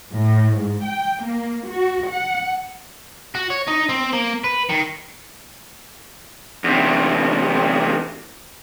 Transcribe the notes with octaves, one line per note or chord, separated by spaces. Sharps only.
A2
G#2
G5
A#3
F#4
F#5
F#4
C#5
D#4
C4
A#3
B4
D#3
E2 C3